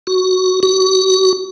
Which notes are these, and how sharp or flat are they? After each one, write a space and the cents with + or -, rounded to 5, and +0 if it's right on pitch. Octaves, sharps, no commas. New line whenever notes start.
F#4 +5
F#4 +35